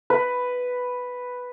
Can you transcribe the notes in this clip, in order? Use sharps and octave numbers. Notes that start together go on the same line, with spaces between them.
B4